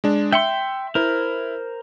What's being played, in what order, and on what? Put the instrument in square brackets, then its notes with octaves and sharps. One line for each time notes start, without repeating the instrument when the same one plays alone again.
[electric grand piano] G#3 D4
[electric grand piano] E5 C#7 [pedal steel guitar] G5 C6
[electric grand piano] E4 [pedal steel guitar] A#4 C5